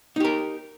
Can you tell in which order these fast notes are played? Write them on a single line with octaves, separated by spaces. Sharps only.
D#4 G4 A#4